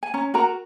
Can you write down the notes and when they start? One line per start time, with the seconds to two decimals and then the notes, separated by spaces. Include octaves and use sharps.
0.03 G#5
0.14 C#4 A#5
0.34 F#4 A#4 A#5